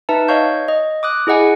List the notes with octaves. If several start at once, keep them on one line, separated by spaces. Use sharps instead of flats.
D#4 B4 E5 A5
C#5 D#5 F5 C#6 G6
D#5
D6 D#6 F#6
E4 G#4 D#5 F#5 G#5